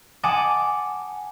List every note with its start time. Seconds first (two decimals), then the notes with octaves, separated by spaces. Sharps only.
0.23 F#5 G#5 A5 D6 D#6